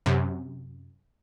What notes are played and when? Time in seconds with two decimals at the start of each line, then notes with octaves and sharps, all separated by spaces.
0.06 F#2 C3